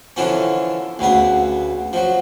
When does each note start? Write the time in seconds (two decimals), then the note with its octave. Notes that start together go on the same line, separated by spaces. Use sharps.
0.16 D3 E3 F3 C#4
0.99 D2 C#3 B3
1.93 F3 F#3